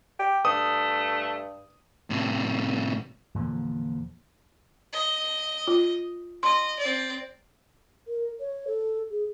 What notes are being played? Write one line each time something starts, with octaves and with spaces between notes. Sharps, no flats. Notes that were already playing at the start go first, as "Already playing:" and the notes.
G4
G2 A3 D#6
A2 C3
E2 A#2 D3 F3
D#5
F4
D#5 C6
C4 D5
A#4
C#5
A4
G#4